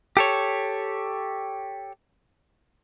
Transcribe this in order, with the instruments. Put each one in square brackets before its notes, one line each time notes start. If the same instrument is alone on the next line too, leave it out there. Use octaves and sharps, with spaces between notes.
[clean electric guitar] G4 A4 C#5